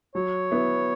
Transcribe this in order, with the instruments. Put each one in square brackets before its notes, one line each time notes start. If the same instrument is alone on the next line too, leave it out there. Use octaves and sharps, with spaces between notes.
[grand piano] F#3 [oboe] C#5
[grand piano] B3 E4